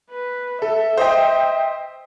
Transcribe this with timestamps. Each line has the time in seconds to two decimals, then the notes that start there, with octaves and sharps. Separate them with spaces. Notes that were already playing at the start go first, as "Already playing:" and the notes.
0.10 B4
0.62 A4 E5
0.98 C5 D#5 G5